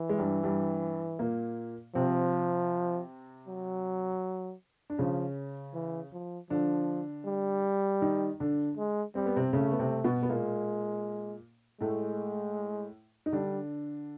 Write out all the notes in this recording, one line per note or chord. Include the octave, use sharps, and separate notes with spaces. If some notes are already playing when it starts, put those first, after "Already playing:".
Already playing: E3
G#3
G2 G3
G2 G3
A#2 A#3
C3 F3 C4
F#3
D4
C#3 F3 C#4
E3
F3
D3 F3 D4
G3
D#3 D#4
D3 D4
G#3
G3 C4
B3
C3 C4
C#3 A3 C#4
B3
C3 C4
B2 B3
B3
A#2 G#3 A#3
A2 G#3 A3
D#4
D3 G3 D4